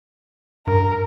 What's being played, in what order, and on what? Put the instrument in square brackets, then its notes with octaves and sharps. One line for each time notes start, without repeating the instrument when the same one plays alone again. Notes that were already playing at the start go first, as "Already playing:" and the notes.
[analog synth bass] G2 [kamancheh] A#4